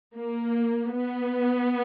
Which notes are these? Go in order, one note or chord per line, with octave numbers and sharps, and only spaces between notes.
A#3
B3